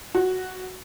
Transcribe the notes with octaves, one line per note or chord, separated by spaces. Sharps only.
F#4